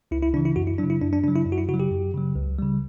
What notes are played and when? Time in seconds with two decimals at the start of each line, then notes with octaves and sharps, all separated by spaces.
0.11 C#2 E4
0.23 E4
0.33 C#3 D4
0.37 E3
0.45 E4
0.56 F#2 F#4
0.67 E4
0.78 C#3 F#3 D4
0.90 E4
1.02 F#2 D4
1.13 D4
1.23 C#3 D4
1.28 F#3
1.36 E4
1.47 F#2
1.52 F#4
1.58 E4
1.68 C#3 F#4
1.74 F#3
1.80 G4
1.91 F#2
2.14 C#3 F#3
2.36 C#2
2.59 C#3 G3